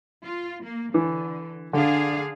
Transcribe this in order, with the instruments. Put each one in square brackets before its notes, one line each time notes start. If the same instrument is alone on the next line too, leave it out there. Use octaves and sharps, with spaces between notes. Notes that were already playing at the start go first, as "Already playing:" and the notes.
[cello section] F4
A#3
[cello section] D3 [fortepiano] E3
[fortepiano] D3 [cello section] D4 G#4 F5